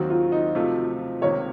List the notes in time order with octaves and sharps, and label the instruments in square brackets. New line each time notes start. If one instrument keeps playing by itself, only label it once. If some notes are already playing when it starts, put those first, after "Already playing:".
Already playing: [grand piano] D#2 D#3 F#3 C4 [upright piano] F#4
[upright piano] F4
D#4
[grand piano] C3 F3 A3 [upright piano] F4
[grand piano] C#2 C3 D#3 A#3 [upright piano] C#5